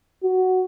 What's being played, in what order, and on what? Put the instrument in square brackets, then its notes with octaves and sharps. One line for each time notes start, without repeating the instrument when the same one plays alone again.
[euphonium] F#4